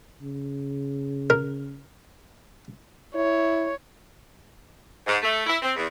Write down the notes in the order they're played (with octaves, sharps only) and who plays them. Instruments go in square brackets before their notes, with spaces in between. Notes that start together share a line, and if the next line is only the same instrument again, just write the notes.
[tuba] C#3
[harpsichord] A#4
[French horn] E4 [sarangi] C#5
[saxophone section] G#2
A3
E4
C4
E2